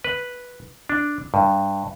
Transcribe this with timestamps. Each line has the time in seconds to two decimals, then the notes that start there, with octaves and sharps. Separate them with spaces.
0.04 B4
0.89 D4
1.34 G2